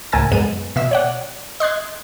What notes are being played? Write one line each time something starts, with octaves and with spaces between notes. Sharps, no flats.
C#2 A2 A#4 G#5 E6 A6
F#2 G#3 B3 D#7
B2 E5 E6
C#5 D5 F#5
D#5 C6 F#6 G#6